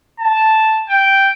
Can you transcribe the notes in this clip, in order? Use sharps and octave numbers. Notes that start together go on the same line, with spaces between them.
A5
G5